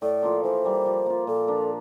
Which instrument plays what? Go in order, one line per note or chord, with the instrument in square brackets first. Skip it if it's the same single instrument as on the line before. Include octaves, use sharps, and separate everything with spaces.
[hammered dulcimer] A2 [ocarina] D5
[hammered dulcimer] F3 A#3 F4
[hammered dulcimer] E3 [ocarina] C5
[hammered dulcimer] G3 A#3
F3
A#3 F4
[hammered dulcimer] A#2 [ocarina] A4
[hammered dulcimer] F3 A#3 D4